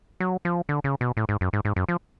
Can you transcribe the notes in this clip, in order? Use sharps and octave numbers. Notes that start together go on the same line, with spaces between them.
F#3
F3
D3
C#3
B2
A2
G#2
F#2
G#2
G#2
F#2
F3